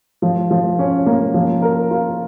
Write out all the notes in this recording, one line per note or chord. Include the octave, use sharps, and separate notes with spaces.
F3
F3
C#4
A#3
F3
A#4
F4